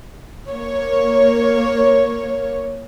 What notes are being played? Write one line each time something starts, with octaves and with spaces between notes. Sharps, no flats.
A#3 C#5